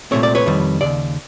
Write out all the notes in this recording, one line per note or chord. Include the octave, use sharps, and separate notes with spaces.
C2 A#2 F#3 A3 C4 C#5
D5
B4 C#5
F2 C3 D#3 G3
D#2 C#3 D5